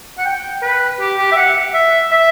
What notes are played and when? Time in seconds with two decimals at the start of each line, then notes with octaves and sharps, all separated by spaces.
0.18 F#5
0.25 G5
0.62 B4
1.00 G4
1.18 G4
1.32 E5
1.36 F#5
1.74 E5
2.11 E5